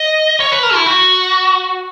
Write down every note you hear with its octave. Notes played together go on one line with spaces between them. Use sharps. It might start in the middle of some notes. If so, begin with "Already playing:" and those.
Already playing: D#5
C#5
B4
A#4
E4
F#4